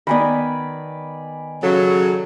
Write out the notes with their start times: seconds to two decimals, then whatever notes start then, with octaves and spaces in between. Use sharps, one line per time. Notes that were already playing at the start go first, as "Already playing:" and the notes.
0.07 D#3 B3 D5 G#5 B5
1.63 C#3 F#3 F#4 A4